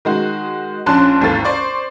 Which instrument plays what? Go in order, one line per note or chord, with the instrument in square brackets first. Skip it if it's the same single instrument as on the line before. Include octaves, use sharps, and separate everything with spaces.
[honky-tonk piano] D#3 G#3 F#4
A#1 C#4 D4 A5 C6 F#6
G#1 D#2 E3 A4 A6
C5 D5 C#6